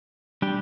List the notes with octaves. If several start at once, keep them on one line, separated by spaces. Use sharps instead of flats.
G3 D4 G4